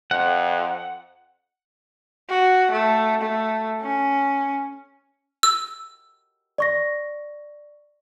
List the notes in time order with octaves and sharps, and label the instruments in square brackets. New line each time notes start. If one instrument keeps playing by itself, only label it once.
[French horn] F2 [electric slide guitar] F#5
[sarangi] F#4
A3
A3
C#4
[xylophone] E6
[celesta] D5 C#6 A#6